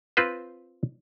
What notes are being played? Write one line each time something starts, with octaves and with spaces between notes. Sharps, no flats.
C4 F4 B4 C5